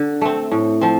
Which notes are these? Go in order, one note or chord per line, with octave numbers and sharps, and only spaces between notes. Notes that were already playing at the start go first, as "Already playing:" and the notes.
Already playing: D3
A3 C4
A2
F3 C4